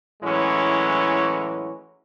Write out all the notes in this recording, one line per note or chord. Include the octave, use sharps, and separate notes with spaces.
A2 E3 F#3 G#3 C#4